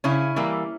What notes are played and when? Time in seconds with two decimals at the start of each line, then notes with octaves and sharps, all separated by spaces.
0.04 C#3 C#4 E4
0.36 E3 G3 A#3